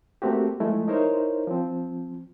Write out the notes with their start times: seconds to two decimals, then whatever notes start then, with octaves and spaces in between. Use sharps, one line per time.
0.22 A3 A#3 C4 F#4 G4
0.60 F3 G#3 A3 E4
0.88 D#4 E4 A#4 C5 C#5
1.47 F3 C4